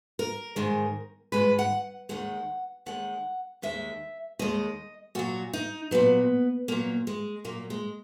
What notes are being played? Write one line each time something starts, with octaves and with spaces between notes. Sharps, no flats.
A#4
G#2 D#3 G#3
G#2 D#3 G#3 B4
F#5
D#2 D#3 G#3 F#5
D#2 D#3 G#3 F#5
D#2 D#3 G#3 E5
D#2 D#3 G#3 D#5
A#2 F#3 F#4
D#4
A#2 F#3 B3
A#2 F#3 A#3
G#3
A#2 F#3 A#3
G#3